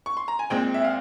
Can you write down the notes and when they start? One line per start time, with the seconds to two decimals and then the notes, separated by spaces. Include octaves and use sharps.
0.06 C#6
0.17 C6
0.28 A#5
0.39 G#5
0.50 A#2 G#3 C4 G5
0.74 E5
0.84 F5